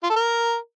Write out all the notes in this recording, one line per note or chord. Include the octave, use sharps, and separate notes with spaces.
F4
A4
A#4